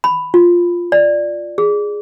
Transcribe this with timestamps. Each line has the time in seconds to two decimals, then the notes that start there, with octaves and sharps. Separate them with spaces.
0.04 B5
0.34 F4
0.92 D5
1.58 G#4